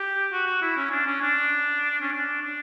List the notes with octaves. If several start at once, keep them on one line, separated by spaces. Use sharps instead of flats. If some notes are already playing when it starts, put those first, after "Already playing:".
Already playing: G4
F#4
F#4
E4
C#4
D4
C#4
D4
C#4
D4
D4